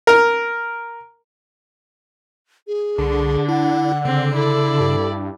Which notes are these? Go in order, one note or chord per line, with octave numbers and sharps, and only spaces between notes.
A#4
G#4
C2 D3 D4
E4 F#5
C#3 C4
E4 A4 D5
G2